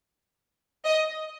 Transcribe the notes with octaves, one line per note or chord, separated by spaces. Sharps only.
D#5